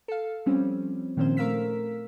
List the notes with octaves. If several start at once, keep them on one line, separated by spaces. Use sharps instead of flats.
A4 F5
F3 G3 C4 C#4
A#2 D#3 F3 C4 C#4 C5
A3 A#4 F5 E6 B6